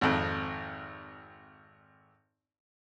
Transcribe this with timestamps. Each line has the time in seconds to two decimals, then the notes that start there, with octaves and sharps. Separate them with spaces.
0.01 G#1 F2